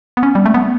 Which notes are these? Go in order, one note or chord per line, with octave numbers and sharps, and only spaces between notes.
B3
C#4
G3
A3
B3